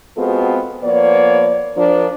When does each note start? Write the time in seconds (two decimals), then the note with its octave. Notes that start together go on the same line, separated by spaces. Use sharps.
0.17 G#3 B3 C4 F4 F#4 A4
0.83 F3 A#3 B3 C#5 D5
1.77 F3 D4 A#4